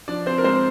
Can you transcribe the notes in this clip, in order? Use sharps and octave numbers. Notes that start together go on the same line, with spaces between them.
F3 D4 D5
C4 C5
A#4
G#3 C4 C5